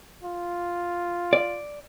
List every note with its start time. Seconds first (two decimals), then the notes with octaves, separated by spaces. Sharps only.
0.24 F4
1.33 D5